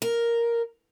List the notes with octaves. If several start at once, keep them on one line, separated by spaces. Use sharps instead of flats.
A#4